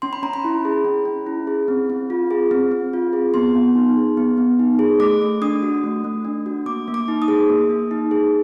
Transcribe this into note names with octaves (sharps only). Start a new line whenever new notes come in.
C#4 C6
B5
C#4 A#5
B5
E4
G#4
C#4
C#4
E4
G#4
C4
C4
F4
G#4
C4
C4
F4
G#4
B3 C6
B3
D#4
G#4
B3
B3
D#4
G#4
A3 D6
A3
D4 D#6
F#4
A3
A3
D4
F#4
A#3 D6
A#3
D6
D#4
D#6
G#4
A#3
A#3
D#4
G#4